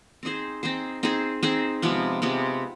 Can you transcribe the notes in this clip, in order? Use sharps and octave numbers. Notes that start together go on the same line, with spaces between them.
C4 D#4 G#4 C5
C4 D#4 G#4 C5
C4 D#4 G#4 C5
C4 D#4 G#4 C5
C3 F3 G#3 B3
C3 F3 G#3 B3